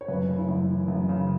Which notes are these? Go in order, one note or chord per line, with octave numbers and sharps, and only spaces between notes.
C#5
F#2 B4
C#3
E4
F#2
E3
F#2
C#3